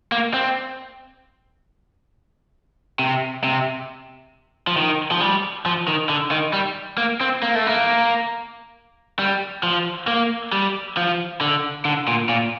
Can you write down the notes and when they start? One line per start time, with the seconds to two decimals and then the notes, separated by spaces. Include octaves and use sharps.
0.12 A#3
0.34 C4
2.99 C3
3.44 C3
4.67 F3
4.77 D#3
5.11 F3
5.20 G3
5.66 F3
5.88 D#3
6.09 D3
6.31 D#3
6.53 G3
6.98 A#3
7.21 C4
7.42 A#3
7.55 A3
7.67 A#3
9.19 G3
9.63 F3
10.08 A#3
10.52 G3
10.97 F3
11.41 D3
11.85 D3
12.08 A#2
12.29 A#2